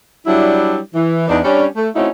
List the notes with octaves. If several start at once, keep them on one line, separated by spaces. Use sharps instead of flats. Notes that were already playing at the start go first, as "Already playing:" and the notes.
F#3 G3 D4 E4
E3
E2 D4 D#4
G3 C#4 D4
A3
A3 C4 C#4 D#4 E4 F#4